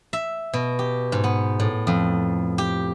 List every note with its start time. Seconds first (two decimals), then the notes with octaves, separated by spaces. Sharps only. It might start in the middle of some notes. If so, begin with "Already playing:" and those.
0.13 E5
0.53 B2
0.79 G4
1.12 G#2
1.24 B3
1.60 A2
1.87 F2
2.58 G4